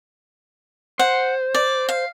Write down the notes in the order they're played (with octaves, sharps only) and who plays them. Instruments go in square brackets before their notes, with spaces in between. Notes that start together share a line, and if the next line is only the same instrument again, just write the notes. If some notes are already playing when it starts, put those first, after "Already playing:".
[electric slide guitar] C5 [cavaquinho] F#5
[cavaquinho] D5
F5